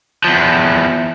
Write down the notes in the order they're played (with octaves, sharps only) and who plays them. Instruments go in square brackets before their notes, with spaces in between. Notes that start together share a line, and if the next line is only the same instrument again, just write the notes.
[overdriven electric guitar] E2 F3